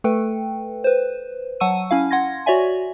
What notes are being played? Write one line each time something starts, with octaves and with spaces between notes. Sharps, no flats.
A3 A4 B4 G5
B4 C5
F#3 F#5 A5 C#6 E6 D#7
C#4 E4 F5
F#5 C6 G#6 A#6
F#4 C#5 D5 E5 G#5